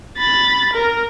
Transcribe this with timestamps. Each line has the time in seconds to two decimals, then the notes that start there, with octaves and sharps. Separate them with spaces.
0.18 B5 A6
0.74 A#4